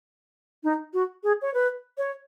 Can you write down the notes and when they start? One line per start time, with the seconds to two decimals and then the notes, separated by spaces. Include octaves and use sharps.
0.64 D#4
0.93 F#4
1.24 G#4
1.42 C#5
1.54 B4
1.98 C#5